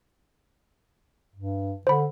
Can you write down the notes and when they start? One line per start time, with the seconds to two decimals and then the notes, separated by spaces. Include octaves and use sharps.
1.35 G2
1.87 D3 C5 B5